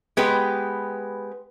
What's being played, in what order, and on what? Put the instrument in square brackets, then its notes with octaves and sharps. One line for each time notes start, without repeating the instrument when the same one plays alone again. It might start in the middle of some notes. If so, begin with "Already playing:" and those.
[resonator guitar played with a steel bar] G#3 B3 G4 B4